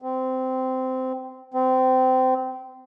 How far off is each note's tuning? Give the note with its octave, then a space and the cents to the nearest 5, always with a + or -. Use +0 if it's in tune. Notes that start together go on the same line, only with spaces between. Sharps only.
C4 -15
C4 -20